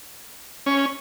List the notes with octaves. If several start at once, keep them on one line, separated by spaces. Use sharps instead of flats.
C#4